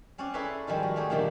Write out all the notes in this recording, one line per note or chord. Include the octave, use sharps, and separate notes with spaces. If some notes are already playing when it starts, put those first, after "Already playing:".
C4 C#4 C#5 D5 F#5
E4 G#4 A4 B4 C#5 C6
D#3 F3 G3 G#3
F#4
A3 G4 G#4
A#2 D3 D#3 F3 G3